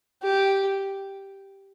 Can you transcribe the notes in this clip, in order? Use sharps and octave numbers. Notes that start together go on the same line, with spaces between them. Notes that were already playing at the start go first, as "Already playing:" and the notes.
G4